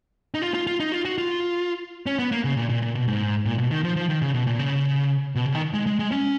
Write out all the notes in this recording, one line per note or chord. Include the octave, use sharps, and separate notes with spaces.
D#4
F4
F4
F4
D#4
F4
F#4
F4
C#4
B3
A#3
C#3
A#2
A#2
A#2
B2
G#2
A#2
B2
D#3
F3
F3
D#3
C#3
B2
A#2
C#3
B2
C#3
D#3
G#3
G#3
G#3
C#4